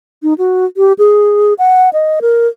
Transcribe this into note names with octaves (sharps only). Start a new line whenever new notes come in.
D#4
F#4
G4
G#4
F#5
D#5
A#4